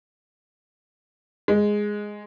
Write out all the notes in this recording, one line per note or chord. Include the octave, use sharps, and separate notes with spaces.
G#3